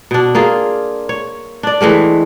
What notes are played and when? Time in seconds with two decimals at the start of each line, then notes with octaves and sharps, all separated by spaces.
0.11 B2 D4
0.35 A#3 F4 G#4
1.09 C#5
1.63 D4 D5
1.81 E3 G#3 A3 G4